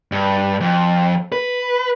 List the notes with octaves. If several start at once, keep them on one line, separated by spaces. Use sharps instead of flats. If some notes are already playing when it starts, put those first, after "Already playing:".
G2
F2
B4